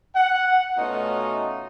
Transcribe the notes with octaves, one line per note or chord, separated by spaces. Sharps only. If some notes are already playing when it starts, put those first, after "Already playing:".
F#5
B2 A3 C#4 D#4 F4 F#4